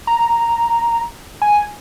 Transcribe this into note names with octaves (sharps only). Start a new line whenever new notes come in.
A#5
G#5